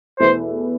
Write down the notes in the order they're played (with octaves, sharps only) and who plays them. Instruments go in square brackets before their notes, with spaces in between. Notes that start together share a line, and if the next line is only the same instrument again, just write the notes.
[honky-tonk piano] E2 B2 A3 E4 B4 [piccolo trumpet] C5